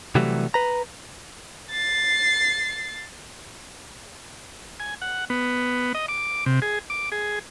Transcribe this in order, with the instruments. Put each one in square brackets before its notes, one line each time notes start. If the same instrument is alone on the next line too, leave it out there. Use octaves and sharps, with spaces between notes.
[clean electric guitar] C3 E3 F#3 G3 A3
B4 A#5
[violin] A6 C7
[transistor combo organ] G#5
F#5
B3
D#5
D6
C3
G#4
D6
G#4